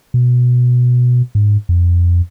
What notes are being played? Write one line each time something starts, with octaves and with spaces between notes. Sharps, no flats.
B2
G#2
F2